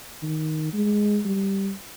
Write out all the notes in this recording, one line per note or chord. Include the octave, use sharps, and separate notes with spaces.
D#3
G#3
G3